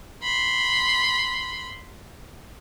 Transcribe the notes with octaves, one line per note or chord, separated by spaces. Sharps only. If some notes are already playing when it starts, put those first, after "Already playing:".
B5 C6